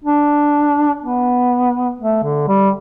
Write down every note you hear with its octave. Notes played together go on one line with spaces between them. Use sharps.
D4
B3
A3
D3
G3